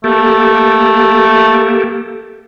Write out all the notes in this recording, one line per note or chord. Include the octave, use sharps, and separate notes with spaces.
A3 A#3 G4 A4